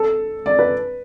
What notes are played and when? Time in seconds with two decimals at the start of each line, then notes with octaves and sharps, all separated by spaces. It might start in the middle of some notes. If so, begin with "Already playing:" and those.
Already playing: A4
0.46 D5
0.59 B4